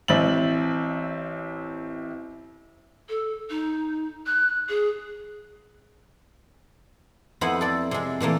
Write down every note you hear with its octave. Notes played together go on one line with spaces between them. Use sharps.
A1 C4 E5 A6 F#7
A4
D#4
F#6
G#4
F2 B3 E4 C5 D#5 F#5
A4 D5
C3 G#3
A#2 E3 A3 A#3